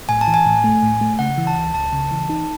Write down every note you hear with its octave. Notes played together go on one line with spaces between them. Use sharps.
A2 G#5
A5
E3
G#5
A2
A3
A2
A3
C#3 F#5
E3
A5
C#2
C#2 A5
C#3
E3
D#4